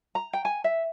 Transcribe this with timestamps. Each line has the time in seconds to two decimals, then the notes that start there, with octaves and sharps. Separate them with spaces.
0.15 A#5
0.33 G5
0.45 G#5
0.64 E5